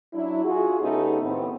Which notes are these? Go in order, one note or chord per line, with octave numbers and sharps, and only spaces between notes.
F#3 D4 E4
F4 F#4 G#4
C#3 A3 B3 C#4 D#4 G4
A2 D#3 B3 C4